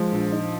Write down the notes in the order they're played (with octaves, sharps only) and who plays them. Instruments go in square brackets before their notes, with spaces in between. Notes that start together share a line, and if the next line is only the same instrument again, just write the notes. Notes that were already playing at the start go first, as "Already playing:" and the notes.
Already playing: [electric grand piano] F3 [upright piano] G#3
[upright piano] A#1
D#4